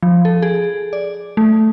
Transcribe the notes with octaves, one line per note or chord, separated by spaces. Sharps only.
F3
A4
G#4
D5
A3